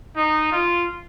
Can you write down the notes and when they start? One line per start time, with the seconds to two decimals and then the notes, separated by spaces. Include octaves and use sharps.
0.16 D#4
0.51 F4